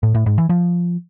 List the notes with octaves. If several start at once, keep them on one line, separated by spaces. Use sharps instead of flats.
A2
A2
G#2
E3
F3